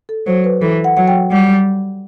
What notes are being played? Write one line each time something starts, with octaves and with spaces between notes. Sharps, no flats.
A4
F#3 C5
B4
E3 A4
F#5
F#3 F#5
G5
G3 F#5